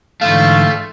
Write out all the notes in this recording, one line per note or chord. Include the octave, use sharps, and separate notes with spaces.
G#2 D3 E3 G3 A3 F4 F5 A5